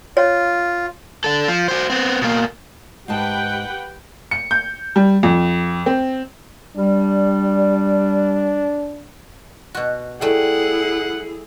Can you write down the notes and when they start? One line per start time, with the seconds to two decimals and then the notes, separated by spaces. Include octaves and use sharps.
0.17 F4 C#5
1.24 D4 A4
1.48 F3
1.68 F#4 C5
1.90 B3 C4
2.21 B2 A#3
3.08 G#2 D#4 G4 B4 F#5 G5 A5
4.31 C#7
4.51 G6
4.96 G3
5.23 F2
5.86 C4
6.76 G3 D4
9.75 B2 F#4
10.21 G3 A3 E4 G#4 F#5